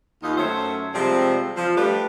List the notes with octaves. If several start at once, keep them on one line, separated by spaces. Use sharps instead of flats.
D#2 D#4 F4
F#2 A3 C#4 C5 C#5 E5
C3 F3 G3 G#3 C4
F3
G3 A3 D4 G4 B4